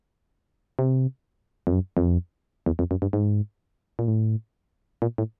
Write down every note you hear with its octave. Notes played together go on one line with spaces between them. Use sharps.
C3
F2
F#2
F2
E2
F2
F#2
G2
G#2
A#2
A2
A#2
A2